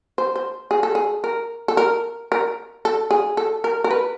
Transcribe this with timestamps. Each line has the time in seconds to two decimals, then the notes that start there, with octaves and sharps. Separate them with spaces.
0.18 C5
0.36 C5
0.71 G#4
0.83 A4
0.95 G#4
1.24 A#4
1.68 A4
1.77 A#4
2.32 A#4
2.85 A4
3.11 G#4
3.37 A4
3.64 A#4
3.84 A#4
3.91 B4